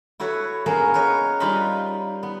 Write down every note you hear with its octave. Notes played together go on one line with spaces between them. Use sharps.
E4 F#4 A4 B4 C#5
A#3 B3 C#4 G#4 A#4
A#4 B4 C#5 D#5
G3 D#4 F4 B4 D#5 B5
B3